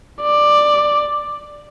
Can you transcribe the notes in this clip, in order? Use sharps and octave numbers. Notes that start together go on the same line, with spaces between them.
D5